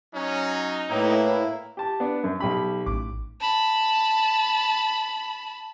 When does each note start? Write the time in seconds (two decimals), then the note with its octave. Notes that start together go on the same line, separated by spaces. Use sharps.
0.15 F#3 C#4 D#4
0.90 A2 A#3 E4 B4 C#5 G5
1.77 G4 A5
2.00 B3 D4
2.24 F#2
2.40 B1 G4 B5
2.86 A1 D6
3.41 A5 B5